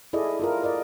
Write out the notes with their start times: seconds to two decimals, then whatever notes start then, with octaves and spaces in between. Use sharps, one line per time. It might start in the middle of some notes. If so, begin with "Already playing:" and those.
0.13 E4 G#4 A4 D5 D#5
0.40 E4 F4 A#4
0.63 A#4 D5 D#5